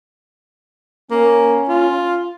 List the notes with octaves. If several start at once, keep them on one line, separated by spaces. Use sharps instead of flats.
A#3 C#4
F4